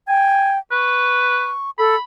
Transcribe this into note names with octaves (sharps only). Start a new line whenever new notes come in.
G5 G#5
B4 C#6
A4 B5